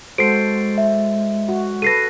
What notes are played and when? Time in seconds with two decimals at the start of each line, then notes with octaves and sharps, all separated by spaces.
0.18 G#3 F#4 A4 C5 C7 D7
0.78 E5
1.49 F#4
1.82 A4 B4 A#6 C7 D#7